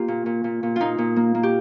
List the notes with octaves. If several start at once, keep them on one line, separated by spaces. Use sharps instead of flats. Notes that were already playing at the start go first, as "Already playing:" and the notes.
Already playing: A#3 F4 G4
A#2
A#2
A#2
A#2
A#2 D#4 F4
A#2
A#3
A#3
G4